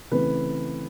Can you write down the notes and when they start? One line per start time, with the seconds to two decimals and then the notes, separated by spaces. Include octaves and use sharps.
0.11 C#3 E3 A3 C4 B4